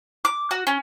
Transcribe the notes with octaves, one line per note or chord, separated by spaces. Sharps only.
D6
F#4
C#4